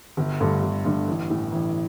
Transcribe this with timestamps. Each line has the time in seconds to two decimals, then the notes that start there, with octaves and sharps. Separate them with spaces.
0.17 G1
0.40 G2 D3 A3
0.62 G1
0.85 G2 D3 A3
1.08 A1
1.30 A2 E3
1.52 A1